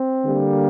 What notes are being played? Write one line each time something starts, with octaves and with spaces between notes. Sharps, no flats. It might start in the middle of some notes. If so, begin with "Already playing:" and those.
Already playing: C4
D3 G3 A#3